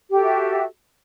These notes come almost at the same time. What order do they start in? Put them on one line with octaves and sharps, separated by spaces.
G4 A4 F#4 E5